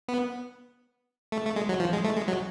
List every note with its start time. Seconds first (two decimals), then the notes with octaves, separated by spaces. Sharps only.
0.08 B3
1.32 A3
1.45 A3
1.56 G#3
1.69 F#3
1.80 F3
1.93 G#3
2.05 A3
2.16 G#3
2.28 F#3